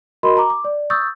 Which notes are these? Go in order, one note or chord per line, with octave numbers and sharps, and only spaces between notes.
F#4 A#4 D#5 B5 C6
A#5 D6
D6
D5
C#6 D#6 E6 G6 A6